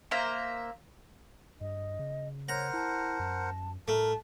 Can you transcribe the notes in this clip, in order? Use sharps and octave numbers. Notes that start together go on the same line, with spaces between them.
A#3 C5 E5 A#5
G2 D#5
C#3
A#4 C5 C#5 F#5 A#5
E4 A5
F#2
A2 A3 A#4 A5